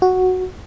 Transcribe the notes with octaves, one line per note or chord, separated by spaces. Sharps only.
F#4